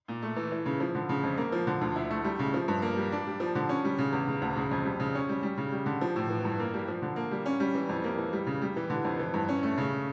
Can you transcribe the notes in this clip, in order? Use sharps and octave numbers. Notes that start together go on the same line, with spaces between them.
A#2
A3
E3
E3
C#3
F3
D3
C#3
F2
A#3
F3
D3
D2
E4
A3
G3
C#3
F3
G2
A#3
G3
D4
G3
F3
D3
C#4
G3
C#3
E2
C#3
D2
C#3
F2
G3
C#3
C#4
G3
G3
C#3
G3
D3
F3
A2
E3
G2
A#3
G3
F3
D3
A#3
G3
C#4
G3
E3
F2
A#3
E3
G3
C#3
G3
E3
D3
F2
E3
G2
C#4
A3
C#3